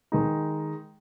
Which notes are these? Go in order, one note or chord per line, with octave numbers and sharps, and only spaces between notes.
D#3 G#3 D#4